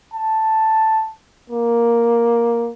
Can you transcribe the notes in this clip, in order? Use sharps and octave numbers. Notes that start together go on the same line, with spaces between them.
A5
A#3